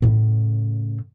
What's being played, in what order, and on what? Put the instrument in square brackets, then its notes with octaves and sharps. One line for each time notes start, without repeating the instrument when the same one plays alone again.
[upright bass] A2 C#3